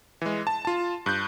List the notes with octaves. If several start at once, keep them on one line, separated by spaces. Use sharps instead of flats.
E3 G#3
A5
F4 A5
G2 F#6 G6